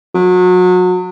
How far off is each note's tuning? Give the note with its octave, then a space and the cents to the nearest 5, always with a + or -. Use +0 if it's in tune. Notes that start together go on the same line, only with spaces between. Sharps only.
F#3 -30